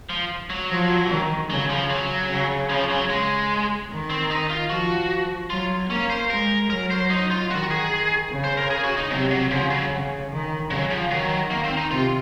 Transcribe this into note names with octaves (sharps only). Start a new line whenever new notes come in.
F3
F#3
F3
D#3
C#3 F#3
F3
F#3
C#3
F3
F#3
G#3
D#3
C4
D#4
F4
F3 F#4
F#3 F4
A#3 C#4
C5
G#3 A#4
F#3 A#4
C5
D#4
F4
D#3 F#4
G#4
C#3
C5
A#4
G#4
F#4
D#4
C3 F#3
F#3
C#3 F3
F#3
C#3
D#3
C#3 F#3
F3
D#3 F#3
A#3
C4
D#4
C3 F4